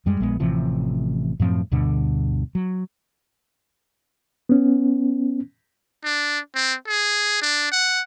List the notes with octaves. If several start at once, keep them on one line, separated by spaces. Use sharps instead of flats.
F#2 G3 G#3
A#1 G#3 B3
A1 C3 E3 F3
F#2 A2 F3 C4
D2 G2 B2 D3
F#3
B3 C#4
D4
C4
G#4
D4
F#5